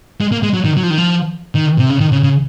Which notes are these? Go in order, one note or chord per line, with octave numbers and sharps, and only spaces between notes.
G#3
A#3
G#3
F#3
D#3
F#3
F3
D#3
F3
D#3
C3
C#3
D#3
C#3
C#3